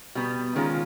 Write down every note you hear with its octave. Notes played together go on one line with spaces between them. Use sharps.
B2 G3 B3
D#3 G#3 C#4 F4